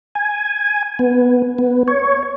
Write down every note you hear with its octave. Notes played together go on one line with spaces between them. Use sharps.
G#5
B3
B3
C#5